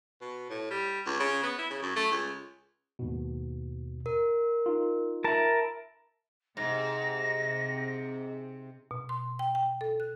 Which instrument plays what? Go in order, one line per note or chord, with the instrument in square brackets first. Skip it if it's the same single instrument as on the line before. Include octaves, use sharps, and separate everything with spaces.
[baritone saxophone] B2
A2
G3
C#2
C#3
B3
E4
C#3
F#2
A3
C#2
[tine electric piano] D#2 G#2 B2
[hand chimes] A#4
[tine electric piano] D#4 F4
[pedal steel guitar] A#4 A5 [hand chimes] E5 B5
[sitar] G#2 [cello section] C3 [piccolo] A#6
[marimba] B2
C6
G5
G5
A4
F#6